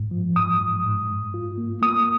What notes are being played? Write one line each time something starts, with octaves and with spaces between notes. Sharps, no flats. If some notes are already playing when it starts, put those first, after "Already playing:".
Already playing: G#2
F3
G#2 D#6
G#2
G#2
G#2
F4
A#3
A#3 D#6